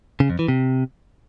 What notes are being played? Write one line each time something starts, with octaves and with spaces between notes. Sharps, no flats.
C#3
F2
E3
C3